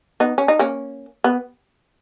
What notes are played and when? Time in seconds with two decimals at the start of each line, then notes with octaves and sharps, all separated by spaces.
0.20 B3 D#4
0.38 C#4
0.48 D#4
0.59 A#3 C#4
1.24 B3